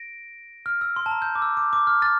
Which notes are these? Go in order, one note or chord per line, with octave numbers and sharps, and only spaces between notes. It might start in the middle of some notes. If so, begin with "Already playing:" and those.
Already playing: A#6 D7
F6
E6
C6
A5
A#5
G6
D6
E6
D6
D6
F6
F6 A6